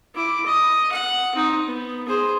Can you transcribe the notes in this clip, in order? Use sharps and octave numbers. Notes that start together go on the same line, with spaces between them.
E4 D6
D#5
F#5
C4 D#4
B3
G#4 C5